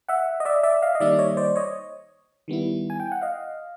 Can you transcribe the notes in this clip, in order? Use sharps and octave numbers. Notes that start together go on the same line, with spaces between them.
E5 F#5
D#5
D5 E5
D5 E5
D#5 F5
D#5
D#3 G3 A#3 D#4 D5 E5
D5
C#5 D#5
C5 D5
C#5 D#5
D#3 G3 B3 E4
G#5
G5
F#5
D#5 F5